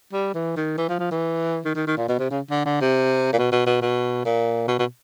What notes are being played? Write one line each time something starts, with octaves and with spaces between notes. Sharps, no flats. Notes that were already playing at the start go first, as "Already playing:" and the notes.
G3
E3
D#3
E3
F3
F3
E3
D#3
D#3
D#3
A#2
B2
C3
C#3
D3
D3
C3
A#2
B2
B2
B2
B2
A#2
B2
B2